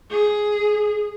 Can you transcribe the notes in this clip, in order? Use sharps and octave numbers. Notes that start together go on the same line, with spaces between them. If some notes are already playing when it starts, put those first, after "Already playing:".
G#4